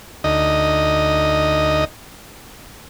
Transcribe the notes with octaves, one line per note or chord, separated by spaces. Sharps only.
D2 D#4 D#5